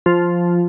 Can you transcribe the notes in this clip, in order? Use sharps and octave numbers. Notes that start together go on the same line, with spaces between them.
F3